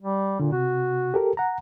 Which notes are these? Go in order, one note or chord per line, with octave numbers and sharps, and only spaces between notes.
G3
A#2 D3
C3 F#4
G4 A4 A#4
F#5 A#5